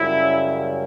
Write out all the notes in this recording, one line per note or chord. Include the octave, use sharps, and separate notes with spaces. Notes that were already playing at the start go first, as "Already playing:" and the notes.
Already playing: F#2 C#3 G3 E4